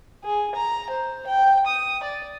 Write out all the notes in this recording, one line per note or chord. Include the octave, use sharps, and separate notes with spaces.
G#4
A#5
C5
G5
D#6
D5